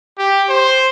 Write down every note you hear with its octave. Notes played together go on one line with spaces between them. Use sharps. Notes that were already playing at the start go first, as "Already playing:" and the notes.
G4
C5